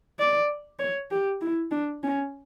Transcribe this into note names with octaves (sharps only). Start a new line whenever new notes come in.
D5
C#5
G4
E4
D4
C#4